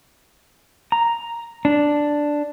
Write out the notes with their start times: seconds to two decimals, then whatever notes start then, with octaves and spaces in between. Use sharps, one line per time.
0.92 A#5
1.65 D4